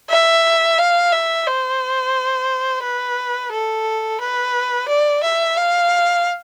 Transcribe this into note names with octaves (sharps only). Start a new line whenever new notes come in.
E5
F5
E5
C5
B4
A4
B4
D5
E5
F5